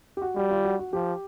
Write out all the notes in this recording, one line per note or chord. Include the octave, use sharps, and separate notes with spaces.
G4
F#4
G3 F#4
F4
F#4
F#4
F3 G4